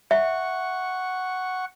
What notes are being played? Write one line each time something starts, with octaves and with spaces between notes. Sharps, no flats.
E5 F#5 C#6